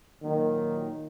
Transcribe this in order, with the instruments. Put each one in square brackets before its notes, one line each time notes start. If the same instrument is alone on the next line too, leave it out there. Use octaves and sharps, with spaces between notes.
[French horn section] A#2 F#3 A#3 [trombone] D#3